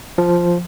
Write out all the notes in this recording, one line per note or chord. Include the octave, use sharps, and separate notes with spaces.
F3